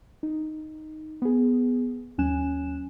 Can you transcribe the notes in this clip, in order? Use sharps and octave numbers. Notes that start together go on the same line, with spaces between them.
D#4
B3 G#4
D#2 F#3 C#4 G#5 F#6 E7